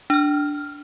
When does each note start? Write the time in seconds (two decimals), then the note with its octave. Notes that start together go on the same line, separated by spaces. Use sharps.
0.10 D4 F6